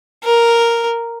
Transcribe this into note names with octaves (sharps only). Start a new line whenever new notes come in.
A#4